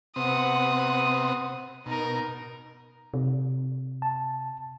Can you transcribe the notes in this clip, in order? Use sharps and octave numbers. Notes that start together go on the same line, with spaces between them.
C3 B3 C4 F#5 D#6
B2 D#4 A#4
C3
A5